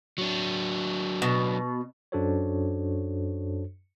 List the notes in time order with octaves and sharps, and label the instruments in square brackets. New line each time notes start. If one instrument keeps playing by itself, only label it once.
[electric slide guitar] F#3 D4
[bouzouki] B2
[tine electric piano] F#2 D4 F#4 A4 C5 C#5